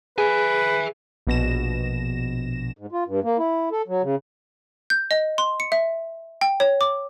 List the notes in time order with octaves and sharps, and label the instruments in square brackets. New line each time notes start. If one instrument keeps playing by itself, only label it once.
[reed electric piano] G#4 [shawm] B4 [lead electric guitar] E5 G#5
[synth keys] A#1 B2 A#6 E7
[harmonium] G#2
F4
G2
A#3
E4
A4
F#3
C#3
[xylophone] G6
D#5
C6
C#7
E5
G5
C#5
D6